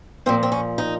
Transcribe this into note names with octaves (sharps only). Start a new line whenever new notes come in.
A#2 F3 C4
C4
C#4
D#4